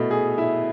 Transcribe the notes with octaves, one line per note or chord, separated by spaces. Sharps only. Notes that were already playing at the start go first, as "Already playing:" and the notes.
Already playing: B2 A3 E4
G#4
E4